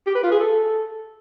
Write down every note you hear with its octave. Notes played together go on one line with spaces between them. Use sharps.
G4
B4
F4
G#4
A4